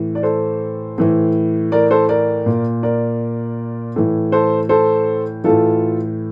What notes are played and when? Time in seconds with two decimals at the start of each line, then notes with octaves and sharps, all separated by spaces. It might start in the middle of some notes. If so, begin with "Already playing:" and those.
Already playing: A2 E3
0.15 D5
0.23 A4 C5
0.98 A2 E3
1.72 A#4 D5
1.91 A4 C5
2.09 A#4 D5
2.46 A#2
2.83 A#4 D5
3.96 A2 E3
4.32 A4 C5
4.69 A4 C5
5.44 A2 E3 F4 A4